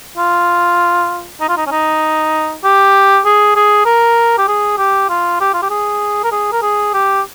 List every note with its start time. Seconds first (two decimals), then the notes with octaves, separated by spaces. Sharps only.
0.17 F4
1.40 D#4
1.49 F4
1.57 D#4
1.66 C#4
1.71 D#4
2.64 G4
3.25 G#4
3.56 G#4
3.85 A#4
4.38 G4
4.48 G#4
4.78 G4
5.09 F4
5.40 G4
5.54 F4
5.62 G4
5.70 G#4
6.24 A#4
6.31 G#4
6.52 A#4
6.62 G#4
6.94 G4